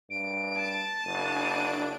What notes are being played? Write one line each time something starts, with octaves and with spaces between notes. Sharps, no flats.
G2 D7
A5
F#1 D4 D7 D#7